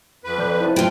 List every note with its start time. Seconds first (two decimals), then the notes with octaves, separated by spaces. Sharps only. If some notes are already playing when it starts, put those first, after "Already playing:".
0.24 F2 B4
0.38 F3 D5 G6
0.61 E4 C5 A5
0.76 F4 G5